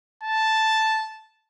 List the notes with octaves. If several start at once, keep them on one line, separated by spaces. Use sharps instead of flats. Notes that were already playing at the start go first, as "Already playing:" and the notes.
A5